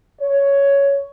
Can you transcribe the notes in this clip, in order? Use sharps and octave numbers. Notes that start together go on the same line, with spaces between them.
C#5